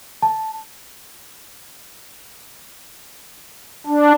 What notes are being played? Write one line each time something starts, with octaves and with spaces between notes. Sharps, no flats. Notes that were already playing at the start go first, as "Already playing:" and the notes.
A5
D4